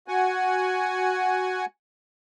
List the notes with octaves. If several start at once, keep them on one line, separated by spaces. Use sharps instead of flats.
F#4 F#5 G#5